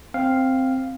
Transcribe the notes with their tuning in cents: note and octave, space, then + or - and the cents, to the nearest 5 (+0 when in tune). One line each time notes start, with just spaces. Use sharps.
C4 +0 F5 +0